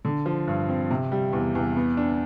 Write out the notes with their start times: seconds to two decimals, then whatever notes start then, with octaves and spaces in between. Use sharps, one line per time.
0.05 D3
0.26 F3
0.48 G2
0.69 C4
0.91 C3
1.12 G3
1.33 E2
1.55 E2
1.77 B3
1.97 D4